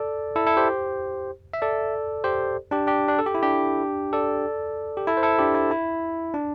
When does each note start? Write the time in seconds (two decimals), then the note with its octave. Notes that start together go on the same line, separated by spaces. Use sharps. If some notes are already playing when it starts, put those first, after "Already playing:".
Already playing: A4 D5
0.36 E4 A4
0.47 E4 A4
0.57 G4 C5
1.53 E5
1.62 A4 D5
2.24 G4 C5
2.71 D4 G4
2.87 D4 G4
3.09 D4
3.19 A4
3.26 G4
3.35 E4
3.42 D4 G4
4.13 A4 D5
4.97 G4
5.07 E4 A4
5.17 C5
5.23 E4 A4
5.39 D4 G4
5.55 E4
5.71 E4
6.34 D4